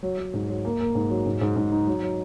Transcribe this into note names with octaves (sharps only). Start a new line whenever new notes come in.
F#3
F#3
G#2
F#3
A#3
A#3
G#2
F#3
G#2
G#2
G#2
D#4
F#3
F#3